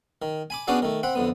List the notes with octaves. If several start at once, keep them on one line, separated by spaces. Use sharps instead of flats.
D#3
G#5 B5 D6
B3 C#4 D4 F#4 G#4 D5
D#3 A3
C4 F#5 B5
F2 D3 B3